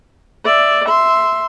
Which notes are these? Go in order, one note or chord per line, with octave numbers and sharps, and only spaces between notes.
D5 E5
E5 C6